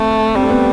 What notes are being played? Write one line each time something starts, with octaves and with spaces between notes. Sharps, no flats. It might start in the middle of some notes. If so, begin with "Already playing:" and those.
Already playing: A3 C4
G3 C4
A3
B3